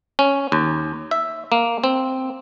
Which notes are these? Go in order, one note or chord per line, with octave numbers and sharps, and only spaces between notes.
C#4
D#2
E5
A#3
C4